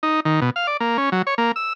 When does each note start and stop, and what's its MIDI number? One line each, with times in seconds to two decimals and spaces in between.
0.03 0.20 63
0.25 0.40 51
0.42 0.50 47
0.56 0.67 77
0.67 0.77 74
0.80 0.97 58
0.98 1.10 61
1.12 1.22 54
1.27 1.35 73
1.38 1.52 58
1.56 1.73 88